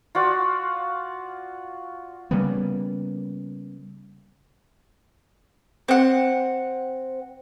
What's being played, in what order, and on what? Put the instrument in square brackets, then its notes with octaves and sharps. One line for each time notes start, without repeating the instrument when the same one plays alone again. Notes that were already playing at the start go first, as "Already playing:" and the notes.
[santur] F4 F#4 D5
[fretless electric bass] C#3 G3 A#3 B3
[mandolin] C4 F#5